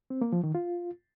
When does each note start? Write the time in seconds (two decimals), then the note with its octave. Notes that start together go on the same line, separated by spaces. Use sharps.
0.10 C4
0.21 A#3
0.33 F3
0.44 D#3
0.55 F4